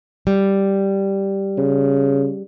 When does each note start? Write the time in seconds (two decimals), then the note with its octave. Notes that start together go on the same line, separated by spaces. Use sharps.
0.27 G3
1.58 C#3